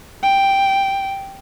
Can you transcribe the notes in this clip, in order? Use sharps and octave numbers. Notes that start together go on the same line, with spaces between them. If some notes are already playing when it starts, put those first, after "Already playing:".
G5